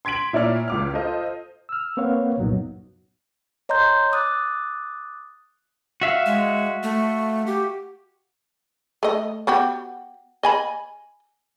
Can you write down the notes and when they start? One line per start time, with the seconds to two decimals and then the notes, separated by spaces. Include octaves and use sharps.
0.05 C6 G#6 B6 D7 F#7
0.33 A#2 E4 C#5 D5 F6
0.68 C#2 D6 F6
0.93 F4 A4 C5 D#5
1.69 E6 F6
1.97 A#3 C4 B4 C#5 F5 F#5
2.37 C2 F#2 A#2 F#3 B3 D#4
3.69 C#5 D#5 A#5 C6 G6
4.12 D6 D#6 F#6 A6
6.01 F#4 E5 F5
6.26 G#3
6.83 A3
7.47 G4
9.03 A3 D#5
9.47 B3 F#4 G4
10.43 D#5 G#5 B5